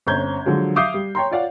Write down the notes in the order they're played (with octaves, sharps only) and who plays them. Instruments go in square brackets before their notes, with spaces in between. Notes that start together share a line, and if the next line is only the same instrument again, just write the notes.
[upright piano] G1 C4 C#4 A#5 G6 G#6
D3 F3 F#3 G#3
E5 F5 D6 D#6 G6 C7
G3
C#5 G5 A#5 C6
F4 C#5 D5 F5 F#5